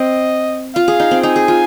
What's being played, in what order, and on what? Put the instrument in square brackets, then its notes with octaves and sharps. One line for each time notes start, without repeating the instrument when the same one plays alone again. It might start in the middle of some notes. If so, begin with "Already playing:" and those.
Already playing: [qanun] C4 [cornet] D#5
[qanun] F4 [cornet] F5
[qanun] G#4
D#4
C4
[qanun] D#4 [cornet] G#5
[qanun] G#4
F4